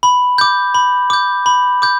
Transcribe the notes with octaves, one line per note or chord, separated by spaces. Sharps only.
B5
D6 G6
B5
D6 G6
B5
D6 G6